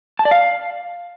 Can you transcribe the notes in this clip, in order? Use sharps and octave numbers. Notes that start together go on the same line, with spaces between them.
A5
D5
F5